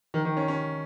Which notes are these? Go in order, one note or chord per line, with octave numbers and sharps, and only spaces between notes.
D#3
D#3
C#4
C#4